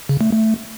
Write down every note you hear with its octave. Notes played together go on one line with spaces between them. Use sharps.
C#3
A3
A3